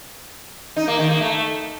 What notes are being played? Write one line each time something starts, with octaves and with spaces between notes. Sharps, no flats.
D#4
A#3
D#3
A#3
A3